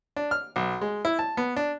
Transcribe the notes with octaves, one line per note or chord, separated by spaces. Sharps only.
D4
F6
B1
G#3
E4
A5
B3
D4